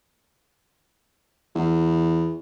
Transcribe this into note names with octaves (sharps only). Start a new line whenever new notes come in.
E2